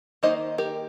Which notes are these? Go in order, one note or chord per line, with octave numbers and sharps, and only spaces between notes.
D#3 A#3 D#4 C5 D#5
G4 A#4